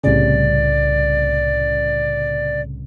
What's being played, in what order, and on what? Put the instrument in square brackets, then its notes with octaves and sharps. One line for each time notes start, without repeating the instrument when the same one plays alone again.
[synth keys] C2 A2 C#3 [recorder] D5